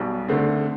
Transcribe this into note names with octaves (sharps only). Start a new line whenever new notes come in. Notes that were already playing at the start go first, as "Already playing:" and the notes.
Already playing: B1 B2 G3
D2 D3 A3 C4